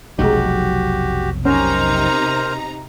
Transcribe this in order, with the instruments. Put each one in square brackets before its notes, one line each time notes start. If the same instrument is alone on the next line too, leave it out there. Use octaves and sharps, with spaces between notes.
[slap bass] F1 B1 F#3 [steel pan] G#3 D#4 [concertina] F#4 G4
[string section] C3 D#4 A#5 [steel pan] C#4 [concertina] A#4 C5